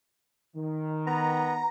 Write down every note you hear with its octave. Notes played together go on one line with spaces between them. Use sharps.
D#3
B3 A#5